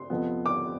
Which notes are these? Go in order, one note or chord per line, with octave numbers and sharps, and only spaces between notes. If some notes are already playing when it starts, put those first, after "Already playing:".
Already playing: C6
F2 C3 F3 B3
D6